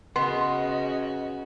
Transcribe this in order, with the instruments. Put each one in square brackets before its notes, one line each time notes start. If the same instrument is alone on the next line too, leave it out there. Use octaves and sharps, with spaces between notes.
[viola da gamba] C#3 F#4 [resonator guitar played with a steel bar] B3 [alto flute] D#5 [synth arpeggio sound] C6